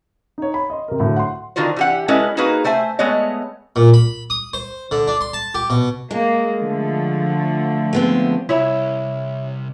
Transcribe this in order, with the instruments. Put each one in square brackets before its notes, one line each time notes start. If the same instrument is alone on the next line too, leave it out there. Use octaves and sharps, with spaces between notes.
[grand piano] D#4 C#5
B5
D#5 C6
C3 A#4
A2 D3 F#3
F#5 C6
[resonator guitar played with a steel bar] D3 D#3 F4 F#4 C5
E3 G4 F#5
G#3 C#4 E4 A4 B4 D#5
A#3 D#4 F#4 G#4 B4
A3 C5 E5 G#5
G#3 A3 B3 C#5 D#5
[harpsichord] A#2
B5
D#6
C5
D3
D4
C6
A5
G4
B2
[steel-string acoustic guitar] G#3 G#4 [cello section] A#3
[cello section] D3 F3 A3
[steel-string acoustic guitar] G#3 B3 C4
[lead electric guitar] C2 [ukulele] E4 C#5 B5